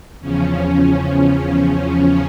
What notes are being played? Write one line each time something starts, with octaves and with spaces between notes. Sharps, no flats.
E2 C#3 F3 C#4
C#4